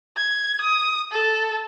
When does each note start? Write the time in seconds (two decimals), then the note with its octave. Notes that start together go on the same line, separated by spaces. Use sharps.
0.16 G#6
0.61 D#6
1.11 A4